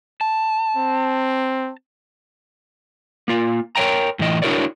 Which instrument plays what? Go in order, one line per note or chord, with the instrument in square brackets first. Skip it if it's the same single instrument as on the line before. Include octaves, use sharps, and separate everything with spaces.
[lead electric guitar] A5
[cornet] C4
[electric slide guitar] A#3 F4
A#4 C#5 D#5 G5 A#5
A2 E3 D#5
D4 E4 F#4 A#4 C#5 D5